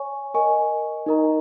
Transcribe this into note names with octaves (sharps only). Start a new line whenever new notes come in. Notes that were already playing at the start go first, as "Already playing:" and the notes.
Already playing: C#5 G#5 C#6
A#4 D#5 G#5 C#6
D#4 A#4 D#5 A#5